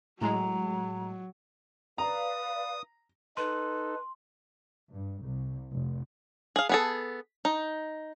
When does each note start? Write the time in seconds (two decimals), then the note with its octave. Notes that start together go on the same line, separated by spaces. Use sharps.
0.21 A2 F#3 G#3 A#5
1.98 B4 D5 F5 A#5 D#6
3.37 D#4 A4 B4 C6
4.94 G2
5.24 C2
5.71 F1
6.56 G#4 F5
6.69 B3 G#4 A4
7.45 D#4